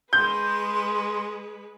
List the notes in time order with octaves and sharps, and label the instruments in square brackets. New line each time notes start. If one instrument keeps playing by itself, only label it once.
[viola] G#3 B4 [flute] C6 [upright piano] G6